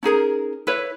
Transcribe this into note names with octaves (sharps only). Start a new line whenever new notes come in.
C#4 D#4 G#4 A#4
E4 B4 C#5